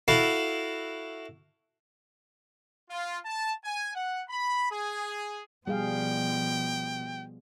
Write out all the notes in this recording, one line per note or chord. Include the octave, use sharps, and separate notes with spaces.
E4 F#4 A4 F5
F4
A5
G#5
F#5
B5
G#4
B2 F3 G3 G#4 F5 G5